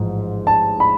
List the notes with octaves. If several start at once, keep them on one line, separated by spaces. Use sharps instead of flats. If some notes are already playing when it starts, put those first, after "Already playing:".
Already playing: A1 G#2 F3
A5
B5